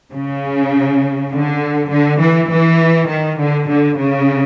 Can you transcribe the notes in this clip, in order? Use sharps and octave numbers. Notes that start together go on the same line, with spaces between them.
C#3
D3
D3
E3
E3
D#3
D3
D3
C#3